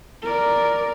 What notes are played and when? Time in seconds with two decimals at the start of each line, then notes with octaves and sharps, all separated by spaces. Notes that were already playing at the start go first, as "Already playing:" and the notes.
0.23 A#4 D5